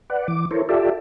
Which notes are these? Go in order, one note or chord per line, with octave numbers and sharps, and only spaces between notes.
B4 D5 F#5
E3 D6
E4 A4 A#4 C5 C#5
F4 G4 A4 D5 E5